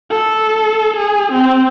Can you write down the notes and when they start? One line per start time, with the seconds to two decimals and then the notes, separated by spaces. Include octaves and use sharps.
0.10 A4
0.97 G#4
1.32 C4